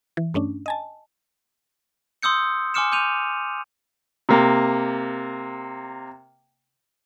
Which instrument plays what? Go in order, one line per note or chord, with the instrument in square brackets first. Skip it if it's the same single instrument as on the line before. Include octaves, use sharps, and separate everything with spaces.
[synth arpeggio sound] E3
G2 A3 C#4 D4
D#5 G#5 A5
[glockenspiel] C6 D#6 E6 G6 C#7
G#5 C6 D6 F6 C#7 E7
C6 D6 G6 D#7 F7
[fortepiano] C3 A#3